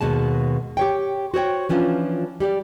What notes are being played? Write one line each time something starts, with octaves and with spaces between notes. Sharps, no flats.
D#2 B2 G#3 A5
G4 C#5 G5
F#4 C5 C#5 G5
E3 F3 C#4 D4 F4
G3 G4 D5